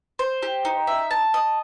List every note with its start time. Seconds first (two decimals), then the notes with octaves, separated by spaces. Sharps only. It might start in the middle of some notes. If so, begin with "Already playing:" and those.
0.19 C5
0.43 G4
0.65 D#4
0.87 E5
1.11 A5
1.34 D#5